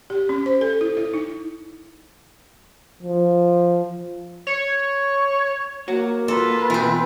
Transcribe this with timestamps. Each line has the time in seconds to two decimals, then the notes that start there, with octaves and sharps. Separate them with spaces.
0.10 G4
0.29 C#4
0.46 C5
0.61 A4
0.81 E4
0.97 E4
1.14 D#4
3.03 F3
4.47 C#5
5.88 A#3 F#4 C#5
6.28 F4 A4 B4
6.70 B2 E3 C4